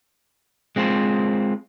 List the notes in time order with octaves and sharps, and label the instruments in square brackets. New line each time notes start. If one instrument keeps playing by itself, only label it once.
[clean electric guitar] G#3 C4 F4 C5